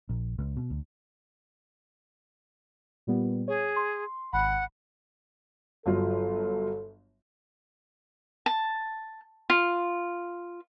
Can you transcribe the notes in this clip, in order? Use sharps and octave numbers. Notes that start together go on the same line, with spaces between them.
A#1
C#2
B2
D2
A#2 G3 B3
G#4 C#5
C6
G#1 F#5 B5
G1 F#3 F4 A4
A5
F4